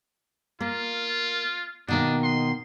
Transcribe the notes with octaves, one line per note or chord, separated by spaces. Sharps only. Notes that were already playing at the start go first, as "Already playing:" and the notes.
A#3 F4
B2 D#3 A#3 D4
C6